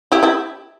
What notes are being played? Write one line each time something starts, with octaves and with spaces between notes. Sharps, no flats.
E4 G4
E4 G4